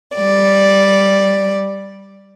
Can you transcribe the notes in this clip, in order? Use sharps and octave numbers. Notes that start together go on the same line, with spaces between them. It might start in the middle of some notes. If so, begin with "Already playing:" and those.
G3 D5